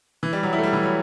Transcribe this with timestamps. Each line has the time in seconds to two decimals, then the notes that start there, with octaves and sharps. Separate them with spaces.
0.23 E3
0.33 G3
0.43 F#3
0.53 E4
0.58 A3
0.63 G3
0.73 E3
0.83 F#3